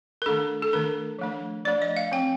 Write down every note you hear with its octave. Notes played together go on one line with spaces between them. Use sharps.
A#4
D#3 A3 D4 A4
A4
D#3 A3 D4 A#4
F3 A3 D4
F3 A3 D4 D5
D#5
F5
F3 C4 G5